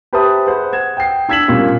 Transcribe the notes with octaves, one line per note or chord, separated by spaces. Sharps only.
G4 B4 C5 E5 A5 D#6
G#4 B4 C5 F#5
F#5 G#6 E7
G5 C7
D4 E6 G#6 B6 E7 F#7
A#2 G3 C#4 F4